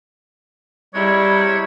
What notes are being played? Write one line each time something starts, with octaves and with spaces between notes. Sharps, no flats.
C3 G3 G#3 E4 C#5